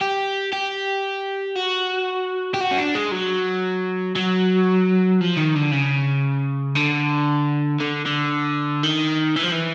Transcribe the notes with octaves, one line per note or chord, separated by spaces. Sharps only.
G4
G4
F#4
G4
F#4
C#4
D4
G#3
F#3
F#3
F3
D#3
D3
C#3
D3
D3
D3
D#3
E3
F3
E3